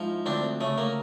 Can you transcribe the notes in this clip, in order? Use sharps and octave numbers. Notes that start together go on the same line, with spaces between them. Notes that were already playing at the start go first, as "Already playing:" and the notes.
Already playing: G#2 F3 E4
D2 C4 D4
C#3 A3
A#3